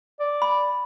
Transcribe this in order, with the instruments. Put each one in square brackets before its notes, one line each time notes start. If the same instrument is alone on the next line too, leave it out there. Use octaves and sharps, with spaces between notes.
[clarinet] D5
[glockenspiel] B5